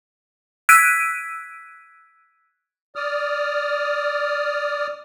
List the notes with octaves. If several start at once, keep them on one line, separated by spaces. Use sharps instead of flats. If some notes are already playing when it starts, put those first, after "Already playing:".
E6 F#6 G#6 B6 D7 D#7
D5 D#6 F6